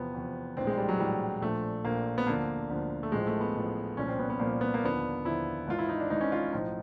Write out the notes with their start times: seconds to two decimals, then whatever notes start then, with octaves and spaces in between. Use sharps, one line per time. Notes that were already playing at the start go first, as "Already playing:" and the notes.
Already playing: E2 C3 F3 B3
0.14 E2 C3 F3
0.57 A#1 A2 E3 C4
0.67 G#3
0.78 G3
0.89 F#3
1.00 A#1 A2 E3 G3
1.42 A#1 A#2 F3 A3
1.84 A#1 A#2 F3 A#3
2.18 B3
2.27 D2 D3 F3 A#3
2.70 D2 D3 F3
3.03 A3
3.12 A1 A2 F3 G#3
3.27 A3
3.41 B3
3.55 A1 A2 F3
3.97 C2 A#2 F3 C#4
4.08 C4
4.19 B3
4.30 B3
4.39 C2 A#2 F3 A#3
4.61 B3
4.74 A#3
4.83 D#2 D3 F3 B3
5.25 D#2 D3 F3 E4
5.68 G#1 G#2 E3 F4
5.79 E4
5.89 D#4
6.00 D4
6.10 G#1 G#2 E3 D#4
6.21 C#4
6.32 F4
6.52 B1 A2 F3 D#4